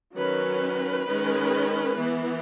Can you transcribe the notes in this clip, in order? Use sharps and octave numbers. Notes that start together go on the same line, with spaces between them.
D#3 F#3 C#4 B4
D#3 G#3 C#4
E3 B3